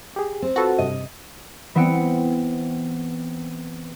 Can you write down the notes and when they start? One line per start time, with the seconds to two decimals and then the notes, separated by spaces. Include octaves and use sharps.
0.16 G4 G#4
0.42 C4
0.56 F4 F#4 A4 B4
0.79 G2 C3 D#5
1.75 E3 B3 C4 G5 C#7